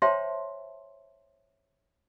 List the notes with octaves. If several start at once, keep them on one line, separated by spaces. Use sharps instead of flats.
C5 C#5 E5 G5 A5 C6